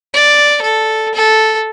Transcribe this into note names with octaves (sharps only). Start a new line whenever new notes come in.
D5
A4
A4